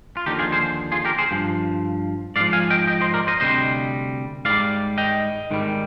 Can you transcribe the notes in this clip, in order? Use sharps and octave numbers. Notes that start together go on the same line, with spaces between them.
F4
D#2 D3 F3 D#4 G4
F4 G#4
G#4 C5
F4 G#4
G4 A#4
G#4 C5
G2 F3
G#2 F3 D5 F5
F5 G#5
D#5 G5
D#5 G5
C5 D#5
A#4 D5
C5 D#5
D2 C3 G3 C5 D#5
G#2 G3 D5 F5
D#5 G5
G#2 D#3 G3